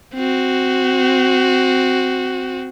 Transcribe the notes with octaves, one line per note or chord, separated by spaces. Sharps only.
C4 F#4